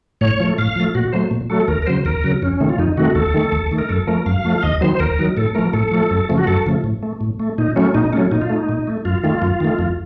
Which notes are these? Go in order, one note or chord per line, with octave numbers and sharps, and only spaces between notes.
A2 C#5
F3 A3
A2 F5
F3 A3
A#2 F#4
F#3 A3 C5
A#2
F#3 A3 A4
D#2 A#4
A#4
C#3 F#3 C5
D#2 A#4
C#3 F#3
F2 C#4
C3 D#3 A3
F4
F2 D#4
C3 D#3 A3 F#4
D#2 A4
D#3 A3
D#2
D#3 A3
A#4
F#2 A4
F3 A3 A#4
F#2 F5
F3 A3
F5
D#2 D#5
D#3 F#3 C5
C5
D#2 A#4
D#3 F#3
A2 A4
F3 A3 A#4
A2 A4
F3 A3
F#2
C#3 F3 A3
F#4
F#2 A4
C#3 F3 A3
A2
A3
A2
A3
A#2 D#4
F#3 A3 C#4
A#2 D#4
F#3 A3 C#4
A#2 D#4
F4
A3 D#4
A#2
A3
F#2 F4
D#3 A3 F4
F#2
D#3 A3
F2